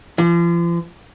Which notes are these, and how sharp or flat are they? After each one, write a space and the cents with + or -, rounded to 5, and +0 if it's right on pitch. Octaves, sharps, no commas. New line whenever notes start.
F3 -40